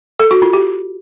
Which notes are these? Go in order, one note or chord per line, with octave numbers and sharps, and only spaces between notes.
A4
F#4
F4
G4